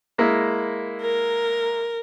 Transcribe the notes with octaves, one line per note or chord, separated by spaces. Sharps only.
G#3 A#3 E4
A#4